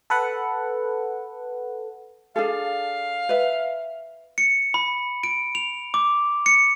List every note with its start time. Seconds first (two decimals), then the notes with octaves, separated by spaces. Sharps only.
0.10 A4 B4 F#5
2.36 D4 G#4 A4 F5
3.29 B4 E5
4.38 C#7
4.74 B5
5.23 D7
5.55 F7
5.94 D6
6.46 C#7